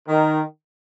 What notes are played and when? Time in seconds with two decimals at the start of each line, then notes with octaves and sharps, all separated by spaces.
0.09 D#3